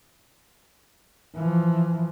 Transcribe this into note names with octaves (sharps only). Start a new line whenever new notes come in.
E3 F3